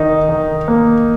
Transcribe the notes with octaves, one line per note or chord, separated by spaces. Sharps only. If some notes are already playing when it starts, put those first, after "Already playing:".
Already playing: D#3 D#4
D#3
A#3